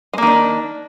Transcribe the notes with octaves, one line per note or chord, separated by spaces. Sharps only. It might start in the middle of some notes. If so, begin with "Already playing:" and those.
D#3 G#3 A#3 D4